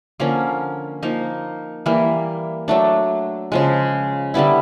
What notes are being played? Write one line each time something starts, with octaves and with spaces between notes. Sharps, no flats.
D3 F3 A#3 C#4
F3 A#3 D#4
E3 G3 A#3
F#3 A3 D4
C#3 F3 G#3
D3 G3 B3 E4